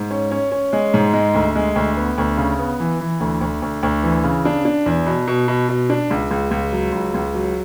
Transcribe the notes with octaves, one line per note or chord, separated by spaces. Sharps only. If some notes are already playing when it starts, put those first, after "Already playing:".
Already playing: G#2
C#4
C#4
C#4
G#3
G#2
G#3
D2
G#3
D2
B3
D2
C#3
B3
E3
E3
D2
D2
D2
D2
E3
C#3
D4
D4
E2
B2
B2
B2
B2
D4
C#2
C#2
C#2
F#3
C#2
C#2
F#3